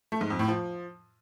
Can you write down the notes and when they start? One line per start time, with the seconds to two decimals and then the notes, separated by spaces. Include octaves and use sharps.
0.12 A3
0.21 G#2
0.30 F2
0.39 A2
0.48 F3